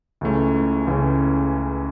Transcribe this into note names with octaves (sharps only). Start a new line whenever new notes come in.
C#2 C#3 E3 A3 C#4
C#2 C#3 E3 A3 C#4